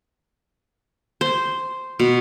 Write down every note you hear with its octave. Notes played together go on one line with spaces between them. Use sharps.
C5
B2